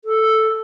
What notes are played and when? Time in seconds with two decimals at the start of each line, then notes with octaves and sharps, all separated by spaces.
0.05 A4